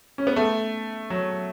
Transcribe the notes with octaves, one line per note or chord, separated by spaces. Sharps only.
C#4
B3
A3
F#3